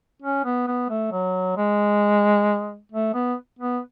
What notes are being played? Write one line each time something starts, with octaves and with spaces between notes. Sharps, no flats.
C#4
B3
B3
A3
F#3
G#3
A3
B3
B3